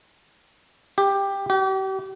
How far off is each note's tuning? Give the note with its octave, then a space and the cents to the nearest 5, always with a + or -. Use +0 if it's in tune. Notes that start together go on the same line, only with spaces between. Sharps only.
G4 +10
G4 -40